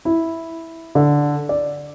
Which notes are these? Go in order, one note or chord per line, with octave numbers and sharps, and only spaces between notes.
E4
D3
D5